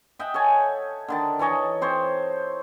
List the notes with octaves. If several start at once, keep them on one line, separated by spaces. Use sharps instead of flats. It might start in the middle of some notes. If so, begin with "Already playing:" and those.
D#5 E5 F#5 G5
A4 C#5 G#5
D3 D#3 A5
E3 A4 C#5 D#5
C4 C5 C#5